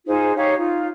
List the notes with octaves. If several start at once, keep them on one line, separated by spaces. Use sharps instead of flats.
D#4 F4 G#4 C5
D#4 G4 C#5 F5
D#4 F4